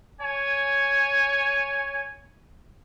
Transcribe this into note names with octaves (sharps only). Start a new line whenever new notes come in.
C#5 G#5